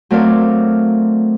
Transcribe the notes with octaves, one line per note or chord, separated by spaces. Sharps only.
F#3 A3 C4 A#4 D5 F5